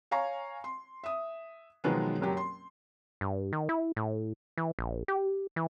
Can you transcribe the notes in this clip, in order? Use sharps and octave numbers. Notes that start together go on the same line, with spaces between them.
C#5 F5 G#5 A#5 C#6
C6
E5 D#6
B2 D#3 F3 F#3 G#3 B3
F#1 F#3 G4
C6
G2
D#3
E4
A2
E3
A#1
G4
E3